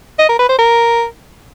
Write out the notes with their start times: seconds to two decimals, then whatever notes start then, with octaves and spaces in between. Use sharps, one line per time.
0.19 D#5
0.29 A#4
0.39 B4
0.49 C5
0.59 A#4